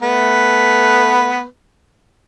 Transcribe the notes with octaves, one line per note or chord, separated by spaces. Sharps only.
A3 B3 B4